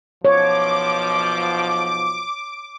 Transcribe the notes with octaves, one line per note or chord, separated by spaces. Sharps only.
B1 B2 F3 C#5 D6